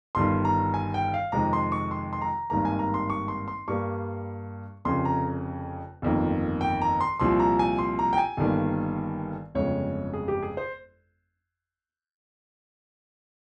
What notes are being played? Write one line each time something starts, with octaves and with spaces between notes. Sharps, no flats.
G1 G2 D#3 C6
A#5
G#5
G5
F5
F2 C3 D#3 G#3 A#5
C6
C#6
C6
C6
A#5
G#1 G2 D#3 A#3 A#5
G#5
A#5
C6
C#6
C6
C6
G2 G3 A#3 C#6
F1 F2 C#3 C6
A#5
G1 F2 D#3 A#3
G5
A#5
C6
C2 A#2 F3 C6
A#5
G#5
C6
A#5
G5
G#5
G1 G2 D#3 A#3
G1 F2 C#3 G#3 C#5
G#4
G4
G#4
C5